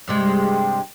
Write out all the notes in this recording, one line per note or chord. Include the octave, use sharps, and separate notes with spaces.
G2 C3 G#3